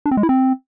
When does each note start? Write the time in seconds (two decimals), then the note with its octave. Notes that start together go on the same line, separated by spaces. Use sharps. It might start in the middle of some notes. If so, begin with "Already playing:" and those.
0.06 D4
0.11 C4
0.17 G#3
0.23 E4
0.29 C4